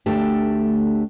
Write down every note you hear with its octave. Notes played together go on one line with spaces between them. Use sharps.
D2 A3 D4 G4